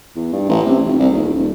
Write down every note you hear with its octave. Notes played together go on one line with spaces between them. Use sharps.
E2
G2
A1
C3
F1
C2
D#1
D#1